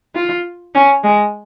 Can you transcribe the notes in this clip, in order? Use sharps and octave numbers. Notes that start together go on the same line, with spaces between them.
F4
C#4
G#3